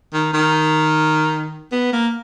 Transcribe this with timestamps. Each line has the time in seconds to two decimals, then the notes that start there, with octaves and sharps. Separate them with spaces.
0.13 D#3
0.33 D#3
1.72 B3
1.93 A#3